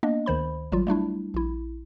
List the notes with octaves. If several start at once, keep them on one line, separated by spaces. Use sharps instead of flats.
A#3 B3 D4 D#5
D2 D#3 C5 B5
G#1 F#3 G3 F4
G3 A3 D4 E4
A#1 E4